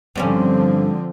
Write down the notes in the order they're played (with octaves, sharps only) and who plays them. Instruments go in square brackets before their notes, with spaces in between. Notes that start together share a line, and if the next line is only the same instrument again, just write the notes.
[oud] G2 G3 C#4 [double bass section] D3 F3 C4